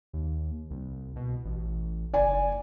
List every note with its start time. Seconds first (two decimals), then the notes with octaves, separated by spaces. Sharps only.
0.13 D#2
0.70 C2
1.16 B2
1.45 A1
2.14 F#1 D5 G#5